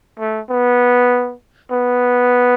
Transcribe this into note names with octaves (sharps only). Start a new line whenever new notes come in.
A3
B3
B3